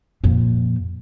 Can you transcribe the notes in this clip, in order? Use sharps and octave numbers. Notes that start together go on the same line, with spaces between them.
F2 A#2